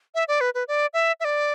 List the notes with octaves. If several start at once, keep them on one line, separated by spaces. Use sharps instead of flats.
E5
D5
B4
B4
D5
E5
E5
D5